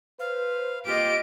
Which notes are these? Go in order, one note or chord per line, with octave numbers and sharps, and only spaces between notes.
B4 C5 F5
A#3 C4 F4 G4 D#5 D7